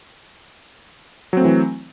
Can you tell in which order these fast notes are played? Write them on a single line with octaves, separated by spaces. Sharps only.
F#3 C4 A3 E3